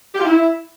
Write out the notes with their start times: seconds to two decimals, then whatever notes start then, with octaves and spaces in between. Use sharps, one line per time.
0.14 G4
0.19 F4
0.25 E4